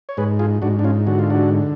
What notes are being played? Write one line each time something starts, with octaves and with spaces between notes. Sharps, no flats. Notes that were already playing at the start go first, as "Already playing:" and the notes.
C#5
G#2 G#4 B4
F4 G#4
G#2 D4 F#4
D4
C#4 F4
D3 F#4
F4
D4 F#4